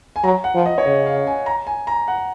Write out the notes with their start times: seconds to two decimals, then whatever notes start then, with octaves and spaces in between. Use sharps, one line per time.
0.16 G#5
0.24 F#3 A#5
0.44 F#5
0.55 F3
0.66 D#5
0.78 C#5
0.85 C#3 D#5
1.06 F5
1.27 G#5
1.46 A#5
1.67 G#5
1.87 A#5
2.08 F#5